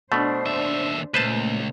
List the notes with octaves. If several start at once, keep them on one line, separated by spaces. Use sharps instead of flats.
B2 A3 D4 C5
D#2 E5
C#2 A#2 A3 B4 C5 A5